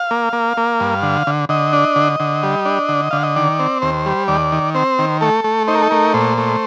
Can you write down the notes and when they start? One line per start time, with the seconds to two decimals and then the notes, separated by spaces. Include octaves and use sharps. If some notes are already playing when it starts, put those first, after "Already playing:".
Already playing: F5
0.11 A#3
0.33 A#3
0.57 A#3
0.80 G2
1.03 D3
1.27 D3
1.49 D3 D#5
1.73 D4
1.96 D3
2.20 D3
2.43 G3
2.65 D4
2.89 D3
3.11 D3 F5
3.23 D#5
3.36 D#3 D5
3.59 C4
3.82 D#2 C5
4.06 G3
4.28 D#2 D5
4.52 D#3
4.75 C4 C5
4.99 D#3
5.21 A3 A4
5.44 A3
5.68 D#4 C5
5.75 A#4
5.83 A4
5.91 A3 A#4
6.14 A#2 C5
6.38 A3